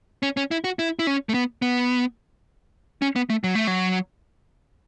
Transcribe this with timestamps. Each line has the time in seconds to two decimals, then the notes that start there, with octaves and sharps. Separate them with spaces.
0.23 C#4
0.37 C#4
0.51 E4
0.64 F#4
0.79 E4
0.99 E4
1.07 C#4
1.29 A3
1.34 B3
1.62 B3
3.02 C#4
3.16 B3
3.30 A3
3.44 F#3
3.55 A3
3.67 F#3